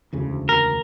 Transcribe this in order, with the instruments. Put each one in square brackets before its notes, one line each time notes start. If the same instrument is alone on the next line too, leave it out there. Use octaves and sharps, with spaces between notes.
[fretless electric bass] E1 D2 C#3
[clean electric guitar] A#4